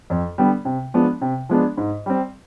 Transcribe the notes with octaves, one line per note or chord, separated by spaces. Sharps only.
F2
D3 G3 B3
C3
F3 G#3 B3 D4
C3
F3 G#3 B3 D4
G#2
G3 C4